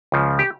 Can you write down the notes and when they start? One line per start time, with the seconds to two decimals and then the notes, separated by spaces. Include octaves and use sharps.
0.12 C#2 C#3 F3
0.39 G4